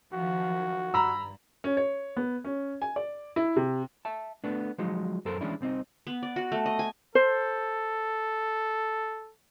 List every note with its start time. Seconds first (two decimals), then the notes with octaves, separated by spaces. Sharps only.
0.14 D#3 F3 F#3 F#4
0.94 G2 A#5 B5 E6
1.64 C#4
1.77 C#5
2.17 B3
2.45 C#4
2.82 G#5
2.96 D5
3.36 E4
3.56 C3
4.05 E5 A5
4.44 A3 B3 D4
4.78 F3 F#3 G#3 D#4
5.25 F#2 A4 A#4 C5
5.41 E3 G#3 C#4 D4 E4
5.61 C2 C3 C4 D#4
6.07 B3
6.23 D5
6.36 F#4
6.52 A3
6.66 D#5
6.79 G#5
7.15 A4 C5